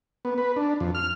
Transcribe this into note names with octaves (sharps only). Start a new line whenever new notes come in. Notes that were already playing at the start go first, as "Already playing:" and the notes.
B3
B4
D4
F2
F6